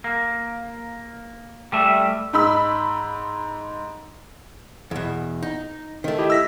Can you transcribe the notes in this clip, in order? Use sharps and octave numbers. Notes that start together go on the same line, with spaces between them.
A#3
G3 A3 E5
G#2 D#4 B5 E6
E2 B2
D#4
D#3 A3
E4 G4 D#5
E6 A#6 B6